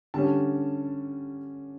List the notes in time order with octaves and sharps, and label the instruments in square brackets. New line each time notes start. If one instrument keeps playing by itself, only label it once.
[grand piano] D3 G3 C#4 A5